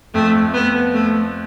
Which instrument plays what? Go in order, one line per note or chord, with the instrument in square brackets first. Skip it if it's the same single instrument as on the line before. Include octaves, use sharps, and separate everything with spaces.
[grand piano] F2 [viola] A3
[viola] B3
A3